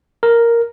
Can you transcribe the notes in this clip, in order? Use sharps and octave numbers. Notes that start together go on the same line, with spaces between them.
A#4